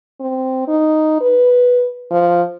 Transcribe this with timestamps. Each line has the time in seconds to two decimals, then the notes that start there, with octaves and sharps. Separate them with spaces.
0.20 C4
0.68 D#4
1.21 B4
2.11 F3